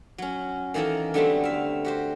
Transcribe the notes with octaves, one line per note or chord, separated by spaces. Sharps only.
F#3 C#4
D#3 E3 A#3 D#4 A4 A#4
D3 F#3 G3 A3 B3 C4
E5 F5
F#4 G4 C5